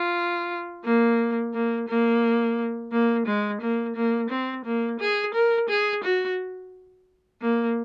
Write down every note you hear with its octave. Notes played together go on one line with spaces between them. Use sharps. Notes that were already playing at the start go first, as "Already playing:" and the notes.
Already playing: F4
A#3
A#3
A#3
A#3
G#3
A#3
A#3
C4
A#3
G#4
A#4
G#4
F#4
A#3